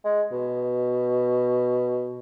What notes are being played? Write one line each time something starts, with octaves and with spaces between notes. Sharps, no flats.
G#3
B2